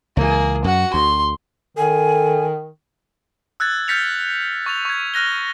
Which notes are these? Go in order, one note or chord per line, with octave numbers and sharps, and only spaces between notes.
C#2 E3 A#3 G#4
F#2 F#4 F#5
D2 C6
D#3 A4 G#5
E6 F#6 G#6 A6
F6 G6 A6 B6 C#7 F7
C#6 A6 F7
C#6 G#6
F6 F#6 A#6 G7